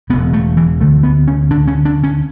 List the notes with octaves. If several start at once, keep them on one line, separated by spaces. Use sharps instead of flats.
E1 E2 C#3 B3
A3
E3
D2 D3 A3
B3
C#4
D2 D3 D4
C#4
D4
C#4